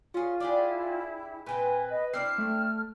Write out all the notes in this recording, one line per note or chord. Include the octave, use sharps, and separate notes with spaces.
C#4 F4 G#4
D4 E4 G4 G#4
A#2 C4 B4 G5 G#5
D#5
C4 D4 E4 F6 C7
A3